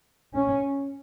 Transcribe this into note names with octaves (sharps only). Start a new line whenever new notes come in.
C#4